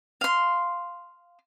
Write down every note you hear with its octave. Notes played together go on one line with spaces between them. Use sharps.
F5 C6